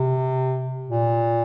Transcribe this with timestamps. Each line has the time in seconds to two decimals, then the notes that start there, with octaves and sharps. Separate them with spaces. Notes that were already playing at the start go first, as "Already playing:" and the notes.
Already playing: C3
0.89 A#2